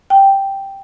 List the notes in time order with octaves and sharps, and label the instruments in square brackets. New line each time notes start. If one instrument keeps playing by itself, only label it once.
[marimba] G5